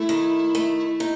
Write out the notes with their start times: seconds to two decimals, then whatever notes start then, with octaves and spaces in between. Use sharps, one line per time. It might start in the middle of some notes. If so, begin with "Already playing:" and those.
Already playing: A3 E4
0.09 D#3
0.55 A3
1.00 D#4